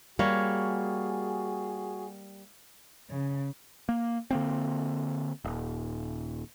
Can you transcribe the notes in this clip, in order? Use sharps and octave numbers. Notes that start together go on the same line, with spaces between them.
G3 A#3 F#4 G#4 C#5
C#3
A#3
D3 A#3 C4
D#1